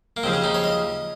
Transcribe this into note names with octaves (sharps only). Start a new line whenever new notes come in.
A#3
D#2 C#3 F3 C4
C#4
D#4
C#5
D#5